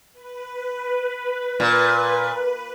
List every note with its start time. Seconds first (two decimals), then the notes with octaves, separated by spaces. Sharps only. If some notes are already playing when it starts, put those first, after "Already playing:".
0.13 B4
1.60 A#2